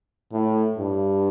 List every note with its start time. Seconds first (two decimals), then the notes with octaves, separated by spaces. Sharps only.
0.32 A2
0.78 G2